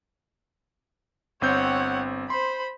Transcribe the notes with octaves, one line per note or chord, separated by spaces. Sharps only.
G1 C4 C#5 F#5 G6
C5 B5 C6